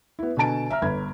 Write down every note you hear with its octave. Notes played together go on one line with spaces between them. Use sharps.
B3 E4
B2 D3 G#5 A5 D7
E5 A#5 F6
G1 B5 G#6